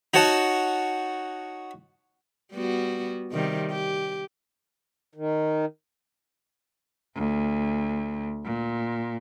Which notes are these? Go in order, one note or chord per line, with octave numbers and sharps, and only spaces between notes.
D#4 F#4 C#5 F#5 A5
G3 B3 F#4
C3 D#3 G3
G4
D#3
D2
A#2